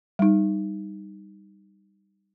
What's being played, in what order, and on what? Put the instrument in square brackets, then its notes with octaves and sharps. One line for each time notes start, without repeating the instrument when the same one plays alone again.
[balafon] G3 D#4